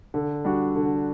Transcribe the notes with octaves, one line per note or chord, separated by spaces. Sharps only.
D3
G3 D4 F#4
D3